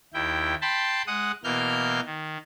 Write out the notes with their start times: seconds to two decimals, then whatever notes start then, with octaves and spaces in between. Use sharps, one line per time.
0.14 D#2 E4 G5
0.62 G5 A5 B5 C6
1.07 G#3 F#5 D#6
1.44 B2 E3 A#3 F6 G6
2.05 D#3